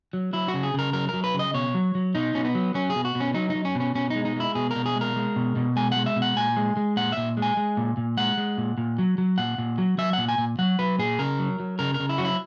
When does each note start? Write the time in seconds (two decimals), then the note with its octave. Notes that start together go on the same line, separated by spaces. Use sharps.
0.13 F#3
0.33 F#3 E4
0.48 F#4
0.54 C#3
0.63 G#4
0.74 C#3 A#4
0.93 F#3 A#4
1.09 F#3 A#4
1.24 B4
1.34 C#3
1.39 D#5
1.54 B2 C#5
1.74 F#3
1.95 F#3
2.15 B2 D#4
2.34 B2 C#4
2.45 B3
2.55 F#3
2.74 F#3 C#4
2.90 G#4
2.95 B2
3.05 F#4
3.15 B2
3.20 C#4
3.34 F#3 D#4
3.50 D#4
3.55 F#3
3.65 C#4
3.75 B2
3.80 C#4
3.95 B2 C#4
4.10 G#3 D#4
4.25 D#4
4.36 G#3 E4
4.55 B2 G#4
4.71 B2 A#4
4.86 G#4
4.96 G#3
5.01 A#4
5.16 G#3
5.36 B2
5.56 B2
5.76 G#3 G#5
5.92 F#5
5.97 G#3
6.06 E5
6.16 B2
6.22 F#5
6.37 A#2 G#5
6.57 G#3
6.77 G#3
6.97 A#2 F#5
7.12 A#2 E5
7.37 G#3
7.42 G#5
7.57 G#3
7.77 A#2
7.97 A#2
8.17 G#3 F#5
8.38 G#3
8.58 A#2
8.78 A#2
8.98 F#3
9.18 F#3
9.38 A#2 F#5
9.58 A#2
9.78 F#3
9.98 F#3 E5
10.13 A#2 F#5
10.28 G#5
10.38 A#2
10.59 F#3 F#5
10.79 F#3 B4
10.99 A#2 G#4
11.19 C#3 A#4
11.39 F#3
11.60 F#3
11.79 C#3 A#4
11.94 A#4
12.00 C#3
12.09 E4
12.18 F#3 F#4
12.25 E4